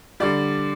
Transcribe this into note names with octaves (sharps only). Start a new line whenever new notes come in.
D3 G3 D5